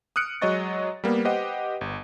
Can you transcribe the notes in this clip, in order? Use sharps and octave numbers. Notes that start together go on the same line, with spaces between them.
D#6 F6 F#6 C#7 D7
F#3 G#3 C#5 D#5 C#6 A6
G3 A#3 B3
G4 B4 C5 D#5 F#5
G1